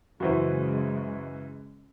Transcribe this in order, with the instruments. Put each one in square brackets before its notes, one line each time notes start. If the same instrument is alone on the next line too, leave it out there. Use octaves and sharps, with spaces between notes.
[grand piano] F#2 E3 [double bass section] C#3 G#3 [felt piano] F#4 C5